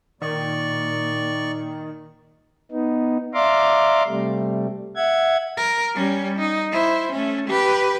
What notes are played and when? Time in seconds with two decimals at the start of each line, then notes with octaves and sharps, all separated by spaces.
0.22 A#2 D#3 D5 C#6
2.72 B3 D#4
3.34 D5 E5 F5 A#5 C6 D6
4.07 C3 G3 A3
4.96 E5 F#5 G#6
5.57 A#4
5.95 G3 C#4
6.39 D#4
6.72 E4 C5
7.12 A3 C#4
7.48 G4 B4